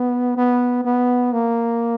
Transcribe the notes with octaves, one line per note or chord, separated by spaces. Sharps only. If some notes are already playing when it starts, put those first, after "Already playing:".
Already playing: B3
B3
B3
A#3